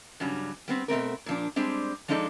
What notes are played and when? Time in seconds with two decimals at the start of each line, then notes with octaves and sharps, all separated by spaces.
0.20 G2 C#3 F#3 G3
0.68 G3 B3 C4
0.88 B2 A3 C4 A#4
1.26 A#2 F3 D4
1.56 G3 G#3 C4 D4
2.08 F3 G#3 D4 D#4 A4 D5